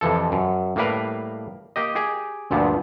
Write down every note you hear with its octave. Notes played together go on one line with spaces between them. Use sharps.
F2 C3 E3 F3 A4
F#2
A2 G3 A#3 A#4 B4 F5
A#3 G4 D#5
G4 G#4
D2 G2 A#2 F3 B3